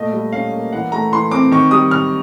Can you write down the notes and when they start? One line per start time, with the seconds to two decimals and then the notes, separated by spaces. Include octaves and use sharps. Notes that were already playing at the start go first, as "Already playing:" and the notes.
Already playing: A#2 A3 D#5
0.13 G3
0.33 C#4 F5
0.52 A#3
0.73 E3 F#5
0.92 A3 A#5
1.12 E3 C6
1.31 C4 D6
1.52 D#3 C#6
1.71 G3 D#6
1.91 D#3 F6